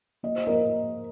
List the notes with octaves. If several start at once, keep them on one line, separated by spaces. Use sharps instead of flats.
A#3 D#5
C5
A#3 A#4 D#5